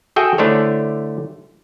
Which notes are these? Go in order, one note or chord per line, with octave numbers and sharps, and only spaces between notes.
F#4 G#4 A4 E5 G5
D3 A3 D4 E4 C5 C#5